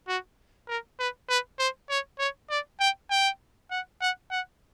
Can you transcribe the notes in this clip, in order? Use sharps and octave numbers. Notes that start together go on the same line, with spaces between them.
F#4
A#4
B4
B4
C5
C#5
C#5
D5
G5
G5
F#5
F#5
F#5